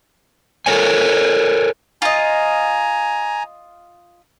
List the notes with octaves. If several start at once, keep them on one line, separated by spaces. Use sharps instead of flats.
A4 A#4 C#5 G#5
F4 D#5 G#5 A#5